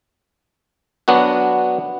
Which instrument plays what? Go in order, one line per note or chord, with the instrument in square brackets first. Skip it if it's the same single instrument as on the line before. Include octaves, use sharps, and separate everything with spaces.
[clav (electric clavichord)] F#3 B3 D4 F#4